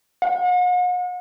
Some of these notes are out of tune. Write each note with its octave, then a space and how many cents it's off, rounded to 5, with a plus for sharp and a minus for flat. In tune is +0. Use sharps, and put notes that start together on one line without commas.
F#5 -45